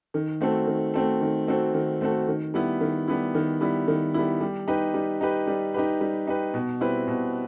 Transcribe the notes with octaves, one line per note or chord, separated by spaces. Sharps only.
D#3
A3 C4 F#4 A4
D#3
A3 C4 F#4 A4
D#3
A3 C4 F#4 A4
D#3
A3 C4 F#4 A4
D#3
G3 B3 E4
D#3
G3 B3 E4
D#3
G3 B3 E4
D#3
G3 B3 E4
G3
D#4 G4 B4
G3
D#4 G4 B4
G3
D#4 G4 B4
G3
D#4 G4 B4
B2
G3 C4 E4 B4
B2